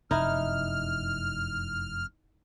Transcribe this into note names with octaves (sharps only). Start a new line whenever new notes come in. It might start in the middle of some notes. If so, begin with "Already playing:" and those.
F1 F#2 D#4 E4 F6